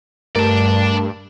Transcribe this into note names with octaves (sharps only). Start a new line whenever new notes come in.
G2 A3 A#4 D5 A5